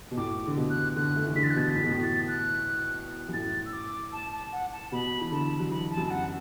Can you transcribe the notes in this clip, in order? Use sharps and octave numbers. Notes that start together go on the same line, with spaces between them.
B2
A2 D6
D3
B2
F#6
D3 F#6
A3
E3
D3 B6
A6
F#6
B2 A6
A2 B6
B2
A2
A6
F#6
F#2
A2 A6
E6
D6
A5
A5
F#5
A5
B2 B5
E3
D3 A5
F#3
E3 B5
A5
F#2
A5
F#5